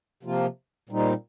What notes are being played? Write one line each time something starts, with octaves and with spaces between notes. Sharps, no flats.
C3 F3 A#3 F4
A#2 G3 C4 D#4